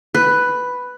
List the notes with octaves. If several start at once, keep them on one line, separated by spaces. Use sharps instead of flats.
B4